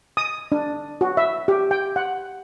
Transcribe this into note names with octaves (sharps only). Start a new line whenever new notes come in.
D#6
D4
F#4
E5
G4
G5
F#5